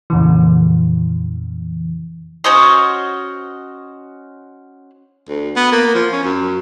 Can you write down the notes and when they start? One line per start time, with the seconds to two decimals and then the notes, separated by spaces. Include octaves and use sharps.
0.10 F2 A#2 C#3 E3
2.44 C#4 F#4 C5 D#5
5.29 D2
5.56 B3
5.72 A#3
5.95 F3
6.12 C#4
6.24 F#2